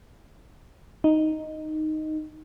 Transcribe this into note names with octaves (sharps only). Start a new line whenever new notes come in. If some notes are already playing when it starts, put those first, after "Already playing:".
D#4